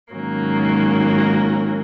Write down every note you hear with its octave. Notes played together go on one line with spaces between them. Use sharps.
G#2 D#3 F#3 A#3 C#4